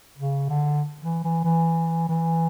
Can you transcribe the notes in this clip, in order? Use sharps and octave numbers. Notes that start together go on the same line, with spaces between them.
C#3
D3
E3
E3
E3
E3